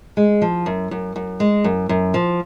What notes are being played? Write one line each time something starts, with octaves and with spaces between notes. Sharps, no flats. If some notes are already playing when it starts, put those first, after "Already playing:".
G#3
F3
F#2
F#2
F#2
G#3
F#2
F#2
F3